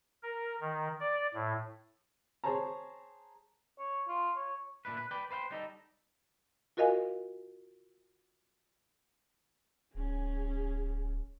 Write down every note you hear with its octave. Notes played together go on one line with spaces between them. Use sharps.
A#4
D#3
D5
A2
G#4 C5 C#5 A5 A#5
C#5
F4
C#5
A#2 D4 E4 B4
B4
B4 D5 G5
B4 C5 F5 G5
G3 D#4 A4
F4 F#4 A#4 D#5 F5 G#5
D1 C#4 G#4